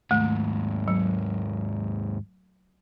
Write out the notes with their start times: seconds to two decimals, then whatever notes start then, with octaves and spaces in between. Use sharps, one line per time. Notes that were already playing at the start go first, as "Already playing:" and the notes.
0.11 D#2 G#2 A3
0.88 F#3